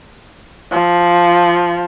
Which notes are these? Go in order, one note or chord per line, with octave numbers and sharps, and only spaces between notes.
F3